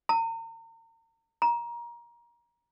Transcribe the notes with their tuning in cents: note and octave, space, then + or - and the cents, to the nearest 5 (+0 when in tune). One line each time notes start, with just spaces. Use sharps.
A#5 -40
A#5 +20